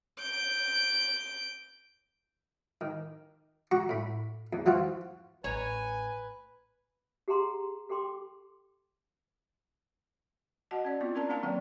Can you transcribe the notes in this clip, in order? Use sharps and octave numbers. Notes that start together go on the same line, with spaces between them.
G6 D7
D#3
F#4 A#5 C#6
A2 B5
E2
E3 F3 F4 F#4
A1 B4 C#5 G#5 A#5
G4 G#4 F#5 A#5 C6
G4 A4 G5 C6 D6
F#4 D#5 F#5 A5
C#4 D5
B3 C4 E4 F4
C#4 D4 A#4 D5 A5 A#5
A#3 C4 D4 F5 A5 A#5
D#3 F#3 A#3 C4 D5 G5